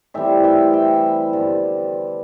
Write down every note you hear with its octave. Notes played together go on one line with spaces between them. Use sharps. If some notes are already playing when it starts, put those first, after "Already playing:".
A2 E3 G3 C4 E5 G5
E5 G5
E5 G5
G2 D3 F3 B3